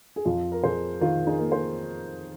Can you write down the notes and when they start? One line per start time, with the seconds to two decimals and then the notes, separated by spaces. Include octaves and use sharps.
0.16 G#4
0.25 F2 F4
0.52 A#4
0.64 F2 G#4 C5
1.01 D#3 F4 A#4
1.27 D#4 G#4
1.39 A#3
1.51 G#4 C5